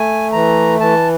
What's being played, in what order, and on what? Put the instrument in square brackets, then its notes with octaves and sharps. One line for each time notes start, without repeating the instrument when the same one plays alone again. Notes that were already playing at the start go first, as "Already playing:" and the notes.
Already playing: [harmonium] A3 G#5
E3 A#5
E3 A5